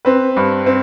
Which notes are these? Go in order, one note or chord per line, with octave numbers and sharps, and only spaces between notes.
C4 B4
G2
C4